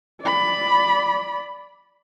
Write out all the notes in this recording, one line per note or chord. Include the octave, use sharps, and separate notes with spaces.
D5 B5